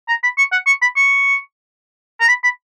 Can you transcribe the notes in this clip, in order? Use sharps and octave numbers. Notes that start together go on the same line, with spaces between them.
A#5
B5
C#6
F#5
C#6
B5
C#6
A#5
B5
B5